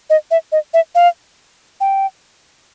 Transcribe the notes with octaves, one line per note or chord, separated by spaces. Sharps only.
D#5
E5
D#5
E5
F5
G5